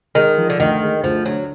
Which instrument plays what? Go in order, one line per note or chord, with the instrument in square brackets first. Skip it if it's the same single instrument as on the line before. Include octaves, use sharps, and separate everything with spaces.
[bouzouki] D#3 [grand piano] G#3
[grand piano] F3
[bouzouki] D3
[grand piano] D2 [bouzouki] D#3
[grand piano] G#3
[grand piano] D2 [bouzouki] F3
[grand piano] D3 [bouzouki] F#3